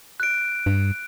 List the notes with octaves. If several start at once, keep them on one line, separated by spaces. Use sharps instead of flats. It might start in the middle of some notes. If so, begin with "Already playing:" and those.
F#6 D7
G2